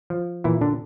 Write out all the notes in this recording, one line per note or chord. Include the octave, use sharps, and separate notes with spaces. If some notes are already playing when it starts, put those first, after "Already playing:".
F3
A#2 E3 E4
D3 D4